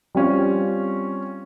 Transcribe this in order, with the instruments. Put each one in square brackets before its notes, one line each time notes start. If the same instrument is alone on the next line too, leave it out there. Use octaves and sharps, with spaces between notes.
[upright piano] G3 C4 C#4 F4